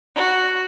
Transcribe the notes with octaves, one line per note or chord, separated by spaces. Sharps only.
F#4